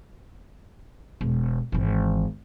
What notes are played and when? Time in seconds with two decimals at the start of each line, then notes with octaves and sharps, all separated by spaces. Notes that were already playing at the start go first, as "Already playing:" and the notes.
1.21 E1
1.72 G#1 E3